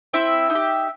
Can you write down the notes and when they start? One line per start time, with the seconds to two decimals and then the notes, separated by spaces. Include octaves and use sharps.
0.13 C4 E4 E5
0.50 D#4
0.55 G4